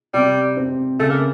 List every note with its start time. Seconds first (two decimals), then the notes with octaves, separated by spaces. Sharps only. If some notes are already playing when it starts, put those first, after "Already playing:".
0.14 C3 G3
0.57 C4
0.99 C#3 A3
1.09 A#3